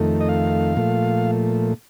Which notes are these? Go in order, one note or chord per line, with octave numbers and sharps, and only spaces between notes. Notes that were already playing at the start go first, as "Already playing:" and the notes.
Already playing: F2 D#3 A3
D#5
F5
A#2 F3 A3